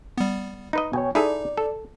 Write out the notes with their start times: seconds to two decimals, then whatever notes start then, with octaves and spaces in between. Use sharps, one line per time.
0.18 G3 B3
0.73 D#4 B4 D#5
0.93 B2 C#5 G5 G#5
1.15 D#4 E4 G#4 A4 D5
1.57 A4